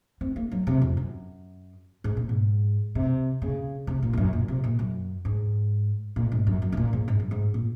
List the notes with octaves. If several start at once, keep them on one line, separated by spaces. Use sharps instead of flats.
C4
A#3
F#3
C3
F2
F#2
G#2
A#2
G#2
C3
C#3
C3
A#2
F2
F#2
A#2
C3
A#2
F#2
G#2
A#2
G#2
F#2
F#2
C3
A#2
G#2
G#2
F#2
G#2
A#2